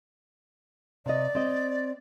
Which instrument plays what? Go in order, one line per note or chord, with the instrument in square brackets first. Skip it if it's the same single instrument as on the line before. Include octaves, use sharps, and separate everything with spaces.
[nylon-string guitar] C3 D#5 [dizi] D5
[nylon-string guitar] C4 D#5